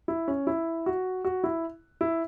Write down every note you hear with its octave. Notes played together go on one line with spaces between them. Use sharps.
E4
C#4
E4
F#4
F#4
E4
E4